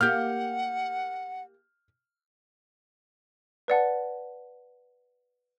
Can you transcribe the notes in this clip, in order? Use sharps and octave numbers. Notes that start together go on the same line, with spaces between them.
A#3 G4 F#5 F6 G6
B4 D5 F#5 A5